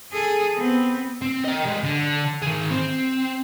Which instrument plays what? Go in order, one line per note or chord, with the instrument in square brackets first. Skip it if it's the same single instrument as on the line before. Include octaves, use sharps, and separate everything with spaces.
[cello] G#4 A4
B3 C4
[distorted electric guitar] C4
D#5 G5
G3 G#3
D3
D#3 G#4
C4